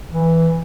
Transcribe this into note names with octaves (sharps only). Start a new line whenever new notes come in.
E3